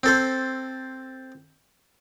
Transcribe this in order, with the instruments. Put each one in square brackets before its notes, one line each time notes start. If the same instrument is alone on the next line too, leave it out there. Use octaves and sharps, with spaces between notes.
[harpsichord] C4 A4 C5